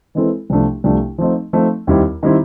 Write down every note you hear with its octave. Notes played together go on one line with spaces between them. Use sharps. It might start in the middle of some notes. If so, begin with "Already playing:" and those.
E3 G#3 C4 E4 A4
C2 C3 F3 A3 D4
C2 C3 F3 A3 D4
F3 A3 C4 D#4
F3 A3 C4 D#4
D#2 D#3 G3 C4 E4
D#3 G3 C4 E4